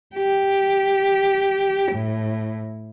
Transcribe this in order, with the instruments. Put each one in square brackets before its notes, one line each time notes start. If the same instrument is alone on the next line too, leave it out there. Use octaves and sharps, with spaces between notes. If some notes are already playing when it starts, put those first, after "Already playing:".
[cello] G4
A2